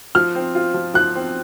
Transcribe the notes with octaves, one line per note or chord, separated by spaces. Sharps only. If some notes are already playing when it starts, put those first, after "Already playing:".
F3 F6
C4
F4
F3
F3 F#6
C4